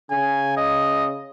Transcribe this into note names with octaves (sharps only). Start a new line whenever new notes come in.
C#3 G#5
D#5